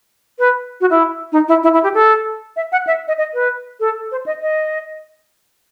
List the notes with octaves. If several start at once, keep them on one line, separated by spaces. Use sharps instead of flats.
B4
F#4
E4
D#4
E4
E4
E4
G4
A4
E5
F#5
E5
D#5
D#5
B4
A4
C5
D#5
D#5